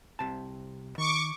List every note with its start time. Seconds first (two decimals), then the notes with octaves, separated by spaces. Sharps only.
0.19 C2 C3 A5
0.98 D#3 C#6 D6